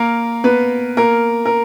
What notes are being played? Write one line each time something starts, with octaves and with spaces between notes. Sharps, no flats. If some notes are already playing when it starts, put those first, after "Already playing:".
Already playing: A#3 A#4
B3 B4
A#3 A#4
A#4